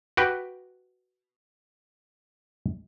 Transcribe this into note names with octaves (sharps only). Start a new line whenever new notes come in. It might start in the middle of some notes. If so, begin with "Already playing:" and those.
F#4 G4 B4 G5